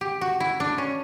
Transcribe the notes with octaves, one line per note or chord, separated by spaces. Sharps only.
G4
F#4
E4
D4
C#4